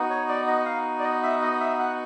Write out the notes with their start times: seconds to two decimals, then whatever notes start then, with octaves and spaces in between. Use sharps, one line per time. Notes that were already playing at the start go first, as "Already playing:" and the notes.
Already playing: B3 D#4 F#4
0.10 C#5
0.29 D5
0.47 D#5
0.66 F5
0.99 D5
1.04 D#5
1.23 E5
1.42 D#5
1.60 E5
1.79 F#5